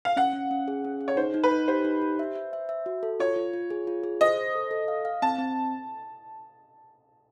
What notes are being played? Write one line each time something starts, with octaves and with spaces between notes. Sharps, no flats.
F5
C#4 F#5
C#4
C#4
G#4
C#4
G#4
C#5
D#4 C5
D#4
B4
D#4
G4 C5
D#4
G4
E5
E5
E5
E5
F#4
A4
F4 C#5
F4
F4
G#4
F4
G#4
C5 D#5
C5
A4
A4
F5
F5
C4 A5
C4